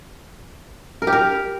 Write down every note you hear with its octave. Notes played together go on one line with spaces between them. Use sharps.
A#4
G4
A#4